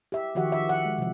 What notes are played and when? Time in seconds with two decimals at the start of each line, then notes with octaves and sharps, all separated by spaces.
0.12 G4 E5
0.35 D#3 F3 F#4 G4 E5 F#5
0.52 E5
0.69 F#5
0.85 G#3
0.98 C3 F3